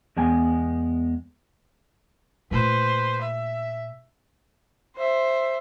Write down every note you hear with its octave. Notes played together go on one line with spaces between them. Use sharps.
E2 G#3 B3 G5 G#5
A#2 A3 B4 C5
E5
C5 E5